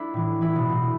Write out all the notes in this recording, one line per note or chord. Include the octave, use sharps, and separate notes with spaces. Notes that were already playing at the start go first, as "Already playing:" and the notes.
Already playing: A3 D4 E4
A2 E3
E3 E4
B2 B3
B2 A3